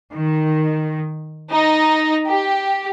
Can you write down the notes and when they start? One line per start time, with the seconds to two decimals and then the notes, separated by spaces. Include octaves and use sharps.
0.12 D#3
1.49 D#4
2.26 G4